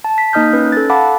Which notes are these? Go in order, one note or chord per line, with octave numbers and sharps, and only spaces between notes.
A5
B6
A#3 D#4 D#5 D#6 F6 G6
C#4 B4
A4 A6
F5 F#5 A5 B5 D6